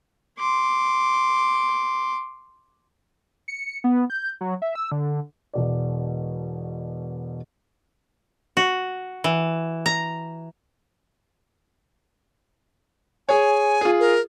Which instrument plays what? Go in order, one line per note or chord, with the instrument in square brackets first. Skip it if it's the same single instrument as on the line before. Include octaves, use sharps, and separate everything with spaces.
[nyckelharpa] C6 D6
[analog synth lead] C#7
B3
G6
F#3
E5
E6
D3
[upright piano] E1 B2 D5
[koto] F#4
E3
A#5
[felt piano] G#4 C#5 [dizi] G#5
[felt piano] F4 G#4
[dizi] A#4